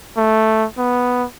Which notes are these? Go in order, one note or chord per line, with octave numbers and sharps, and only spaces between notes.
A3
B3